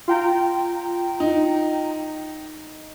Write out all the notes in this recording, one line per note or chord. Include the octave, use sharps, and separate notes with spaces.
F4 G5 A#5
D#4